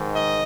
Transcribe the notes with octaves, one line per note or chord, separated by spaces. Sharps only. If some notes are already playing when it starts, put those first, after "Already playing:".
Already playing: G#2 D#3
D#5